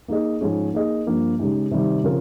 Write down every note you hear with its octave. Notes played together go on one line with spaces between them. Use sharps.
A#3 D#4 G#4 D#5
G#2 F3 G#3 C#4 G#4
A#3 D#4 G#4 D#5
G2 F3 A#3
C#3 G#3 D#4 G4
C3 D#3 G3
C#3 F3 C4 F4 A#4